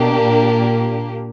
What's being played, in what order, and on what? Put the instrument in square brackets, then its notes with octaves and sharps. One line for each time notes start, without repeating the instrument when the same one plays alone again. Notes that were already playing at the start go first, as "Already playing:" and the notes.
Already playing: [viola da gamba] B2 [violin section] A#3 D4 G4
[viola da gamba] A#2